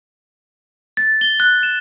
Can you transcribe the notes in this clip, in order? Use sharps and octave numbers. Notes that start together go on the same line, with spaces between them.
A6
G7
F#6
E7